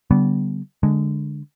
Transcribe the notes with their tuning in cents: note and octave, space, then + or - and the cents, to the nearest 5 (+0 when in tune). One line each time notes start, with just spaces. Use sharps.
D3 -30 G3 -35 B3 -15
D3 +0 G#3 +0